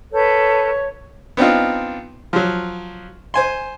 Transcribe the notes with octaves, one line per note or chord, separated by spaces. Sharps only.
A4 B4 C#5 G6
B3 C4 D4 D#4 F4
F3 F#3
C5 G#5 C6